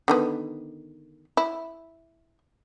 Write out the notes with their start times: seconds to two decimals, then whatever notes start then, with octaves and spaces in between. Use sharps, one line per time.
0.08 D3 D#3 B3
1.37 E4